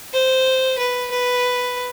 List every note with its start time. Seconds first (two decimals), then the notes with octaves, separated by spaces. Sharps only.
0.13 C5
0.78 B4
1.11 B4